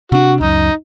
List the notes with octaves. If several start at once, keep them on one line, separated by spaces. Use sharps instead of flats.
C3 D4 F#4
C#2 F#2 D#4